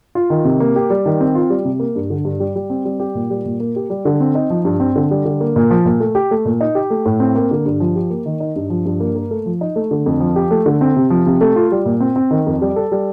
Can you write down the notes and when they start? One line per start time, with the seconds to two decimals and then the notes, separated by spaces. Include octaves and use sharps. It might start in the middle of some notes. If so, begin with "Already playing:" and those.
0.15 F4
0.30 D#3
0.45 C3
0.60 A#3
0.76 G4
0.90 G3
1.06 D#3
1.21 C4
1.35 F4
1.50 G3
1.65 C3
1.80 A#3
1.95 G2
2.10 D3
2.25 G2
2.40 G3
2.55 G3
2.70 C4
2.85 G3
3.00 G4
3.15 A#2
3.30 G3
3.45 A#2
3.60 A#3
3.76 G4
3.90 G3
4.05 D3
4.20 C4
4.35 D#4
4.50 F3
4.65 G2
4.80 C4
4.96 D3
5.11 G3
5.25 D3
5.41 A#3
5.56 A#2
5.71 F3
5.85 A#2
6.00 A3
6.15 G4
6.31 A3
6.45 A#2
6.61 D#4
6.75 G4
6.90 A3
7.06 A2
7.20 C4
7.35 A#3
7.51 D3
7.66 G2
7.80 F3
7.96 G4
8.10 A#3
8.26 D#3
8.40 D#4
8.56 G2
8.70 F3
8.86 G2
9.00 A#3
9.15 A#4
9.31 A3
9.46 F3
9.61 D#4
9.76 A3
9.91 D3
10.06 F2
10.20 F3
10.36 G4
10.51 A3
10.66 D3
10.81 C4
10.96 C3
11.10 F3
11.26 C3
11.41 A3
11.56 F4
11.72 G3
11.86 A#2
12.00 C4
12.16 C4
12.31 D#3
12.47 F2
12.61 G3
12.76 A4
12.92 G3